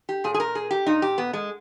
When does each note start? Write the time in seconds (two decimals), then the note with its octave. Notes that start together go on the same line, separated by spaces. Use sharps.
0.09 G4
0.24 A#2 G#4
0.34 G#4
0.40 A#4
0.55 G#4
0.71 G4
0.86 A#2 D#4
1.02 G4
1.18 B3
1.33 G#3